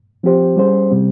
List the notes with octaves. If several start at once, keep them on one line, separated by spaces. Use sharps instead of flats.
F3 C4 G4 C5
G3 C#4 G#4 C5
C3 G3 C4